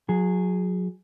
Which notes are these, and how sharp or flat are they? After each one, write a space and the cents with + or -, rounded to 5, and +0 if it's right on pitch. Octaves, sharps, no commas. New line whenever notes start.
F#3 -25 G#4 +0